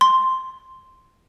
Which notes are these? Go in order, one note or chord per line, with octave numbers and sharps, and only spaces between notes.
C6